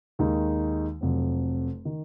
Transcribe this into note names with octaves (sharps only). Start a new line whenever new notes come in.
D#2 D#3 G#3 D#4
F1 F2 C3 F#3 C4
D#3